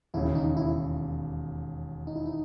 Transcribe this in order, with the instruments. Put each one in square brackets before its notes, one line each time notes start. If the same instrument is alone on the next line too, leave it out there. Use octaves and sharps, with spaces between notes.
[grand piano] E1 D#2 C#3 [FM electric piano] E4
[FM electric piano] D#4
E4
D#4
E4
D#4